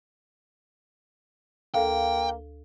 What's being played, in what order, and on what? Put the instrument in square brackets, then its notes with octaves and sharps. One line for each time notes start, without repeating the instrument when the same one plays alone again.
[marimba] D2 A4 F5 [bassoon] A#3 [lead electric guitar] G5